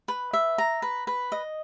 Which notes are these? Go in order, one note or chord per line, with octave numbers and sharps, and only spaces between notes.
B4
E5
A#5
B4
B4
D#5